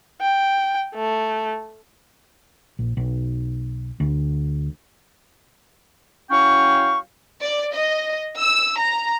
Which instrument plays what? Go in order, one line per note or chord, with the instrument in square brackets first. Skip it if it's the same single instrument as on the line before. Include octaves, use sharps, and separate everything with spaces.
[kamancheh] G5
A3
[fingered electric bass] A#1
B1
D2
[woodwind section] F#3 C#4 E4 F5 G5 C#6
[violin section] D5
D#5
E6
A#5